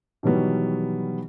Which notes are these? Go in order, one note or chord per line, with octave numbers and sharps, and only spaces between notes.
B2 D#3 E3 F#3 G3 B3